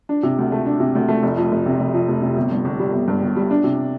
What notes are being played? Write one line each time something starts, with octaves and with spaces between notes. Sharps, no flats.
D4
C3
D2
A3
D4
C3
D2
A3
F1
F2
F1
C3
F1
F2
F1
C3
G1
G2
G1
G3
G1
G2
G1
G3
D4
C3